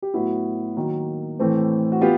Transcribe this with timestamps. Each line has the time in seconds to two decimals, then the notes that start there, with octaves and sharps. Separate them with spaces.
0.02 G4
0.14 A2 F#3 B3 E4 F#4
0.76 D#3 F#3 A#3
1.39 A2 E3 A3 C4
1.92 F#4
2.01 B3 F4 G4